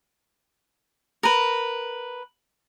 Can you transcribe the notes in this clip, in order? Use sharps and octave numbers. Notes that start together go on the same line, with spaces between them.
A#4 B4